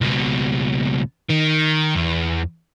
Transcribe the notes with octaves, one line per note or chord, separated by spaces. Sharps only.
C#2 B2
D#3
E2